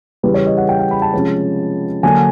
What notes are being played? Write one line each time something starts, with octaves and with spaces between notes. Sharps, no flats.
C#3 E3 G3 B4
C#5
D#5
F#5
G5
G5
B5
A5
C3 F3 G#3 C#4
D3 F#3 A#3 D4 G#5